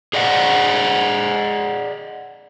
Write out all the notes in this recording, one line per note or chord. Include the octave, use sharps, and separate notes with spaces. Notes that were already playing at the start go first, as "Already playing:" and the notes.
G#4 D5 D#5 F#5